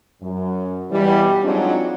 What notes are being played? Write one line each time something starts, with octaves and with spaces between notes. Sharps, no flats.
F#2
E2 B2 E3 G3
F#3 G#3 C4 D4 D#4 F4